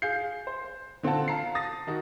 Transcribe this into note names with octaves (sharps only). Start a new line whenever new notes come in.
G#4 F5 G6 C7
C5
D3 C4 F4 F#5 A5
F5 A5 A#5 C7
D#6 A6 A#6
D#3 D#4 F#4